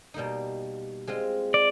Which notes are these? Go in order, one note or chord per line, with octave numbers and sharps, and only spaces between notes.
B2 G3 A#3 D#4
G#3 C4 F4
D5